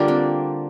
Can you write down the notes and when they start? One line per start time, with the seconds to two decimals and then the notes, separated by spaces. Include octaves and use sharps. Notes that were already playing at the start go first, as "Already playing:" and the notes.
Already playing: D3 G3 A#3 D4 F4
0.08 C4